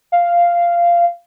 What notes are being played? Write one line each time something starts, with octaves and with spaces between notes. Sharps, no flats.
F5